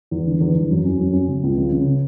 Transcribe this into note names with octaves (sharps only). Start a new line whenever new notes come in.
E2
D3
E2
E2
F#2
C#4
F#2
C#4
C#3
C#2
C#3
C#3